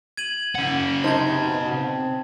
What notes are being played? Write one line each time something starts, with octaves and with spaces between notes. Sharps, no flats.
G#6 D#7 F#7
C#3 F#5
C3 D#4 C5 A5 G#6
B2
C4